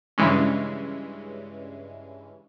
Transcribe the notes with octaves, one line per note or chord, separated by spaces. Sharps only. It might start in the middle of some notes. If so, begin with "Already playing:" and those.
G2 C#3 E3 G#3 C#4